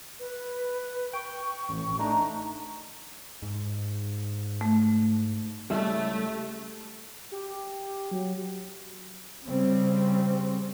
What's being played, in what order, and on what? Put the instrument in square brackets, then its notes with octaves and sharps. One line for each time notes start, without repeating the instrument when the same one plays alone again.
[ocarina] B4
[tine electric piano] G5 [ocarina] C#6
[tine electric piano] A1
[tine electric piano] A3 D4 D#4 [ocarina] A#5
[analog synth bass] G#2
[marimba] A3
[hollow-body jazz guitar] C#2 G3 E4 [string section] A3
[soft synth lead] G4
F#3
[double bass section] C#3 G3 C4